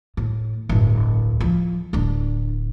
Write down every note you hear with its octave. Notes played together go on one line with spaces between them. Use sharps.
A2
D1 G1
F3
D1 D4